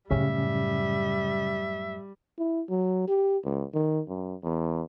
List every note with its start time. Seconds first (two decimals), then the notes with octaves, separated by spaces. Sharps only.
0.11 F#2 A2 C#3 G3 C#4 G4 E5
2.38 E4
2.69 F#3
3.08 G4
3.44 C#2
3.74 D#3
4.08 F#2
4.43 E2